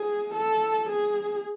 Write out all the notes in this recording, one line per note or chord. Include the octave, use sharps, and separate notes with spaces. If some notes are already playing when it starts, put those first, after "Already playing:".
Already playing: G#4
A4
G#4